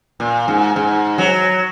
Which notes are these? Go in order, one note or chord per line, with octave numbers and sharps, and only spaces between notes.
A#2
G#2
G#2
F#3